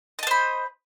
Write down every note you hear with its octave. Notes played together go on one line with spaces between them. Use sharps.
C5 D#5 A5 B5